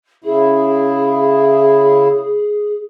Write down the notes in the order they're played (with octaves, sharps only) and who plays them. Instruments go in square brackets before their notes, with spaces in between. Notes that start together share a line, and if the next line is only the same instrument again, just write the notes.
[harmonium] C#3 E4 [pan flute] G#4